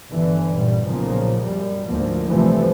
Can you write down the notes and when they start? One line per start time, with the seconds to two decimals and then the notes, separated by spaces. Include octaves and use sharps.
0.10 G1 D3 E3
0.52 A1 G2 A#2 G3
0.84 B1 A#2 C#3 F3 A#3
1.42 F#2 G3
1.86 D2 G#2 F3 A#3
2.28 G2 C3 E3 F3 A3